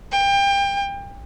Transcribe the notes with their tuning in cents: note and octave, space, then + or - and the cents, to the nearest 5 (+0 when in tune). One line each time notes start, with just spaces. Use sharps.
G5 +25